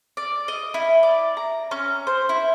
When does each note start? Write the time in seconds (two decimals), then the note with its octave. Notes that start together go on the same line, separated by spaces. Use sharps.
0.17 D5
0.48 D#5
0.74 E4
1.03 D5
1.37 A#5
1.71 C#4
2.07 C5
2.29 E4